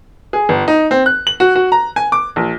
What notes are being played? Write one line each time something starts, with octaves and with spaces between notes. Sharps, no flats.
G#4
G1
D#4
C4
F#6
F#7
F#4
F#4
A#5
G#5
D6
A#1